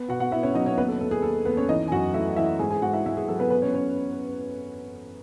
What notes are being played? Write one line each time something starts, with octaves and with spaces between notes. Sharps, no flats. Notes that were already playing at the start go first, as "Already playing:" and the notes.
Already playing: B3
B2 F#4 F#5
F#4 F#5
B3 E4 E5
C#4 C#5
F#3 D#4 D#5
C#4 C#5
D#2 B3 B4
A4
D#2 A4
G#4
D#2 A4
D#2 B3 B4
C#4 C#5
E3 D#4 D#5
G#5
F#2 F#4 F#5
A3 E4 E5
E3 E4 E5
G#2 G#4 G#5
G#4 G#5
G#2 F#4 F#5
E4 E5
G#2 E4 E5
G#4
F#3 A4
B3 B4
B3 B4
C#4 C#5
C#4 C#5